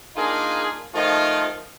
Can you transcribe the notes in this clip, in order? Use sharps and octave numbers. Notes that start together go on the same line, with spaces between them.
A#3 D4 D#4 F4 G#4
D#3 F3 A3 D#4 F4